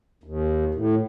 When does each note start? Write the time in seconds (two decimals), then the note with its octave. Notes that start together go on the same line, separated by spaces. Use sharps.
0.24 D#2
0.74 A2